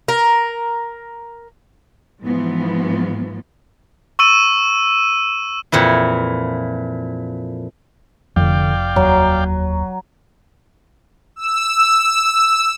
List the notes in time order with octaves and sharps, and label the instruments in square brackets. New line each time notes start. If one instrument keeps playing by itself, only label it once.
[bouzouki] A#4
[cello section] G#2 E3 F3 B3
[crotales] C#6 E6 D#7
[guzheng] F2 A#2 E3 E4
[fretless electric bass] F1 F2 [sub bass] D3 [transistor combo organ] D5 F5 G5
[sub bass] D#2 [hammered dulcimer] F#3
[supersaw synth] E6